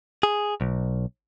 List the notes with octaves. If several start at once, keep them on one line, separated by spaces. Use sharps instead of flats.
G#4
B1